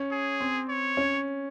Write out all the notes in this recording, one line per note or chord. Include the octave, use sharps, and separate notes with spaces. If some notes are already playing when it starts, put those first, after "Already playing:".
Already playing: C#4
G#4
C4
C#5
C#4